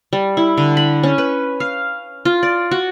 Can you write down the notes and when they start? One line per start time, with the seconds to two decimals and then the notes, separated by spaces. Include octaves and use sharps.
0.13 G3
0.37 E4
0.58 D3
0.77 B5
1.03 C#4
1.18 B4
1.60 F5
2.25 F4
2.43 D5
2.71 F#4